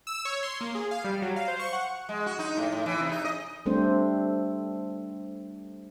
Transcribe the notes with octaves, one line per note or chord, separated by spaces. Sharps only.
E6
C#5
C6
A#3
G#4
F5
G3
F#3
F5
C5
C#6
F#5
G#3
F#4
D#4
A2
A2
E3
C3
D#4
D#5
G3 A3 C4 D4 C5